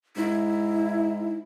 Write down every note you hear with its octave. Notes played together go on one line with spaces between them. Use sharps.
G#2 E4